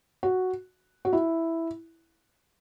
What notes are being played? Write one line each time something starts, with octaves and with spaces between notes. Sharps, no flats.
F#4
F#4
E4